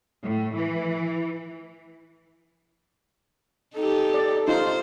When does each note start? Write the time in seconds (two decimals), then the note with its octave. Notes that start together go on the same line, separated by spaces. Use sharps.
0.24 A2
0.56 E3
3.75 D#4 G4 A4
4.14 D5
4.48 D#4 F4 C5